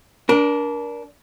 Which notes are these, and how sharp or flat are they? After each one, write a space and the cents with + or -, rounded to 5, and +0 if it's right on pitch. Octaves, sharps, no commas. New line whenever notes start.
D4 -20 A#4 +25